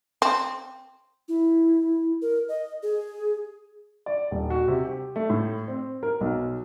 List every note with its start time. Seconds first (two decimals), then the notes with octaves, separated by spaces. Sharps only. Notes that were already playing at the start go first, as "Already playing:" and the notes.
0.22 C4
1.28 E4
2.22 A#4
2.49 D#5
2.83 G#4
4.06 D5
4.31 D#1
4.50 F#4
4.68 C3
4.85 G4
5.16 A3
5.30 A2
5.68 C4
6.03 A#4
6.21 B1